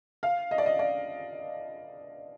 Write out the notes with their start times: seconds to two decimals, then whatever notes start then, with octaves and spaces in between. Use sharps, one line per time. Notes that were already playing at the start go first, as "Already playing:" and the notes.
0.23 F5
0.51 D#5
0.58 D5
0.66 D#5
0.79 D5